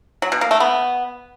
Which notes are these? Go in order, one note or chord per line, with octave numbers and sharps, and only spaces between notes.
F#3
B2
A#3
A3
B3